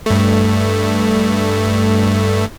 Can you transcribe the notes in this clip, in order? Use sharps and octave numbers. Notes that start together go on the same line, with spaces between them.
G2 A3